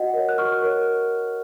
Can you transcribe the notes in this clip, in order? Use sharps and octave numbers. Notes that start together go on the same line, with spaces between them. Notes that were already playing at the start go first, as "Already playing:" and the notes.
Already playing: F#4 D#5 F#5
A#4 C#5
F#6
F#4 C#6 F6
A#4 C#5